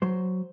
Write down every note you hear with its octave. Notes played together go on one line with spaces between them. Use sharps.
F#3 C5